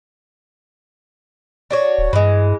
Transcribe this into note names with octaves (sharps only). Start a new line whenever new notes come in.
D4 F#4 C#5
D1
G2 E3 G#3